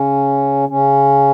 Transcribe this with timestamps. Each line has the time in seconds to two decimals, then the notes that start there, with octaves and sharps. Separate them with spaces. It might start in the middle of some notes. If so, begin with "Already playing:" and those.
Already playing: C#3 C#4
0.69 C#3 C#4